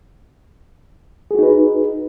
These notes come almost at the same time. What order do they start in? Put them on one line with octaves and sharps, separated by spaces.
G#4 F#4 D#4 B4